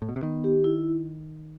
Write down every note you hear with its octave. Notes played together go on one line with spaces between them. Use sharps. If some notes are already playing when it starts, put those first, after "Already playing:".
A2
B2
C3
D#3 B3
G4
E4